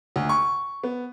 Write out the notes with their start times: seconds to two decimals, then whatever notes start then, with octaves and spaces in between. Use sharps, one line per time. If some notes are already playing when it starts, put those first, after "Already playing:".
0.16 D2
0.29 C#6
0.83 B3